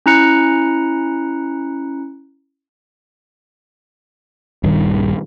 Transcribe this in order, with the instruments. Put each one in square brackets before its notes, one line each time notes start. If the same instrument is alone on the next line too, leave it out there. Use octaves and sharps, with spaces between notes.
[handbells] C#4 E4 A#5 F#6 C#7
[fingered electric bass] D#1 G2 D#3